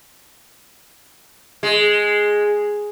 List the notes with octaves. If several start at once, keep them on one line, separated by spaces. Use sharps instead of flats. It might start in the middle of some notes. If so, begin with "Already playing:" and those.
G#3